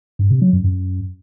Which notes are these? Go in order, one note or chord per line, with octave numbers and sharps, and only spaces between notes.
G2
C3
F#3
F#2
F#2